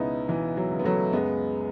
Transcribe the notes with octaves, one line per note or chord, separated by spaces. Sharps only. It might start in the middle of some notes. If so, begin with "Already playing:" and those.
Already playing: C#2 B2 B3 C#4 D#4 E4
B2 E3
F#3
C#2
B3
F#3 A3
F#2 G#3 B3